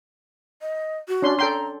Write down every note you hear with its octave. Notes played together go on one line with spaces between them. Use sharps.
D#5
F#4
C#4 D4 C6
A4 G5 A#5 C6